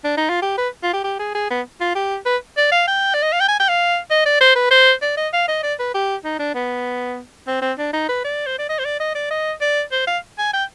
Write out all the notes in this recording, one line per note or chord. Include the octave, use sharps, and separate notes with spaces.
D4
D#4
F4
G4
B4
F4
G4
G4
G#4
G#4
B3
F4
G4
B4
D5
F5
G5
D5
D#5
F5
G5
G#5
G5
F5
D#5
D5
C5
B4
C5
D5
D#5
F5
D#5
D5
B4
G4
D#4
D4
B3
C4
C4
D4
D#4
B4
D5
C5
D5
D#5
C5
D5
D#5
D5
D#5
D5
C5
F5
G#5
G5